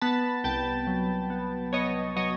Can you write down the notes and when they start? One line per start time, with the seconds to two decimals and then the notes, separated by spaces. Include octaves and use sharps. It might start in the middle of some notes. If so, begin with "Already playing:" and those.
0.02 B3 A5 B5
0.44 C2 G5 A5
0.87 F#3
1.30 B3
1.73 B3 C#5 D#5
2.16 F#3 C#5 D#5